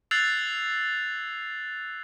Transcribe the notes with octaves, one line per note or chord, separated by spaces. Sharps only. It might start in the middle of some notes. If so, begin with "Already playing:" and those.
E6 F#6 G#6 A6 C7 F7